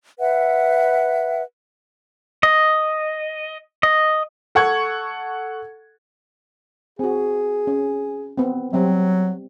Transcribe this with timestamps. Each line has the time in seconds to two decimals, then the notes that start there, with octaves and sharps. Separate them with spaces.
0.20 B4 E5 F#5
2.43 D#5
3.83 D#5
4.55 A4 F#5 C#6 G#6
6.99 C4 F#4 G#4
7.67 C#4
8.38 B3 C4
8.73 F#3 G3 C4 E5